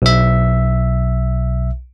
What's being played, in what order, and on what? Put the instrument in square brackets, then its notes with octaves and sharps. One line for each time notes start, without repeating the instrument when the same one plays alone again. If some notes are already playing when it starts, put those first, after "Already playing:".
[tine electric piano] B1 E5